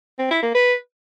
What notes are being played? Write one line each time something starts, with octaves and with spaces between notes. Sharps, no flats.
C4
E4
A#3
B4